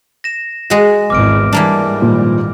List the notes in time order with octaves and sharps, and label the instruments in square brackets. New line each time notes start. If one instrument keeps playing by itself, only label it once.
[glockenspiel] A#6 E7
[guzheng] G#3 F#4 [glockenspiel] A#6
[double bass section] G#1 E2 [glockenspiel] D6 F6 D7
[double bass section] G#2 G3 [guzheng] E3 A#3 D4
[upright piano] A#2 D#3 F3